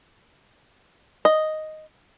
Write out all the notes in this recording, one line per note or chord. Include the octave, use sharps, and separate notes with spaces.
D#5